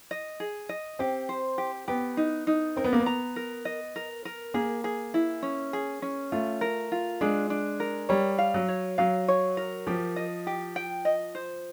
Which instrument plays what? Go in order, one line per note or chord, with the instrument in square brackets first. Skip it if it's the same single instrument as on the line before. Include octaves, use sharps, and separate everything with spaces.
[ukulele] D#5
G#4
D#5
[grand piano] C4 [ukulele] G4
[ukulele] C5
G4
[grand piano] B3 [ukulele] G4
[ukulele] D#4
D#4
[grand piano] C4 [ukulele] A#4
[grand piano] B3
A#3
B3
[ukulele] A#5
A#4
D#5
A#4
A#4
[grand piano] A#3 [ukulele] G#4
[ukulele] G#4
E4
C#4
G#4
C#4
[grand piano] A3 [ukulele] F4
[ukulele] A#4
F4
[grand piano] G#3 [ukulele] D4
[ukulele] D4
A#4
[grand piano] G3 [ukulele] C#5
[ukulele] F5
[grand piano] F#3
[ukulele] C#5
[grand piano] F#3 [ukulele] F5
[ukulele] C#5
A#4
[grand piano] F3 [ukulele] G4
[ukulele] D#5
G4
G5
D#5
C5